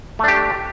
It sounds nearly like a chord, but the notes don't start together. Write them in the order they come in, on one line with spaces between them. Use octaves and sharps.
A3 D4 G4